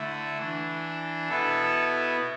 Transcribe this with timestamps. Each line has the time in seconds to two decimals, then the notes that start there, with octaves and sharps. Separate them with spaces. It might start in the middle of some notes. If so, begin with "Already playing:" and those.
Already playing: D3 A3 E4
0.38 E3 D4
1.29 B2 B3 E4 A4